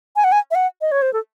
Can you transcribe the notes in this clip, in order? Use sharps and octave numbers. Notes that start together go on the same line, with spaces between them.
G#5
F#5
G#5
E5
F#5
D#5
C#5
C5
A4